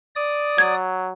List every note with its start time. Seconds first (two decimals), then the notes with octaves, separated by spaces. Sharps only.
0.16 D5 D#6
0.58 F#3 G#6